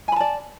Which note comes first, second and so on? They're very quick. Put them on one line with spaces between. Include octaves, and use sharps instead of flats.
G#5 B5 A5 D5